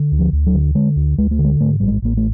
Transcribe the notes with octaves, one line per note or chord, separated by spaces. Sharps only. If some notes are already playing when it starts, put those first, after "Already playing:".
Already playing: D3
D2
F3
D2
F#3
D3
D3 G#3
D2
D2 G#3
A3
D3
G#3
G#2 A3
A1 G3
G#3
A1 A#3
A3